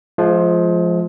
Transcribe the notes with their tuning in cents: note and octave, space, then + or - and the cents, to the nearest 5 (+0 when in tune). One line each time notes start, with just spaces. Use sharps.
F3 +0 G#3 +30